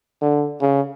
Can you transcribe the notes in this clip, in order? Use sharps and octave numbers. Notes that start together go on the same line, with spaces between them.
D3
C#3